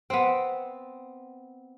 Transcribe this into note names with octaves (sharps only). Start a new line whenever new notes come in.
B3 C4